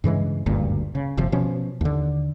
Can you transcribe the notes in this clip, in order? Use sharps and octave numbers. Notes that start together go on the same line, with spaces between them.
G2 C#3 E3 G#3
F#1 D2 G2 A#2
C#3
F#1 C3 F3
B2 F3 C#4
D#2 D3